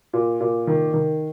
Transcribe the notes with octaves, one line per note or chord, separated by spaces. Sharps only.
A#2
A#2
D#3
D#3